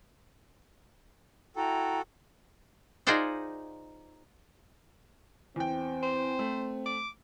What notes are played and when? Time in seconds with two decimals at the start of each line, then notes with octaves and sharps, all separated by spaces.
1.56 E4 F#4 A4 G5 A#5
3.07 D#4 F4 G#4 C5 D5 F#5
5.56 E2 C4 G5
6.03 C5
6.39 A3
6.86 D6